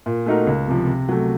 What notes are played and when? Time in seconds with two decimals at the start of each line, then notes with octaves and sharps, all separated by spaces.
0.06 A#2
0.26 A3 D#4 F#4 A#4
0.47 C#2
0.68 C3 F3
0.87 C3
1.09 F#3 A3